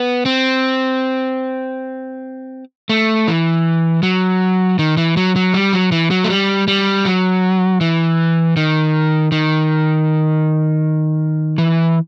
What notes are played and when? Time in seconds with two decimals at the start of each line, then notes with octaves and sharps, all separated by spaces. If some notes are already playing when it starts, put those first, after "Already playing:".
Already playing: B3
0.26 C4
2.89 A3
3.28 E3
4.03 F#3
4.79 D#3
4.97 E3
5.17 F#3
5.36 F#3
5.54 G3
5.73 F#3
5.92 E3
6.11 F#3
6.24 A3
6.30 G3
6.68 G3
7.05 F#3
7.81 E3
8.57 D#3
9.32 D#3
11.58 E3